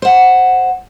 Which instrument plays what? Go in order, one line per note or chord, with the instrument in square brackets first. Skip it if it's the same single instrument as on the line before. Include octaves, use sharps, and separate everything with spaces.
[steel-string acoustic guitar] C5 F#5